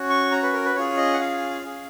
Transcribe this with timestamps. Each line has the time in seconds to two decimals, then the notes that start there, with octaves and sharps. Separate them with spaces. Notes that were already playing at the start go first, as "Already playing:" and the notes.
Already playing: C#4 F#4
0.09 C#6
0.31 A#5
0.43 B4
0.53 A#4
0.65 B4
0.75 C#4 F4 G#4 C#5
0.97 D#5
1.13 F#5
1.20 F5
1.64 C#4 G#4